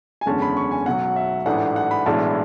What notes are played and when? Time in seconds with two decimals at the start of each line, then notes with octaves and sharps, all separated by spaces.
0.21 G#5
0.26 F#1 E2 D3 G#3 C#4 A5
0.42 B5
0.57 C#6
0.71 G#5
0.86 B1 B2 F#3 F#5
1.16 E5
1.46 A1 G#2 E3 A3 D4 F#5
1.76 F#5
1.91 B5
2.06 B1 A2 E3 G#3 D4 A5